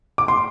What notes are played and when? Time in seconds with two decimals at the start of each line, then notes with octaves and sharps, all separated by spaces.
0.18 D6
0.28 C6